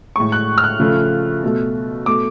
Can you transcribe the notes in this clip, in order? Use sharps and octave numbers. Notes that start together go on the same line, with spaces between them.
A2 G#3 C#6
F#6
F6
F#6
C#3 F3 A3
B2 A3
B2 A3 D6